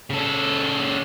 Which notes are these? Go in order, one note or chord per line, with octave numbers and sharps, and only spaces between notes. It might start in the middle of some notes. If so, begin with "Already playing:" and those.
C#3 A4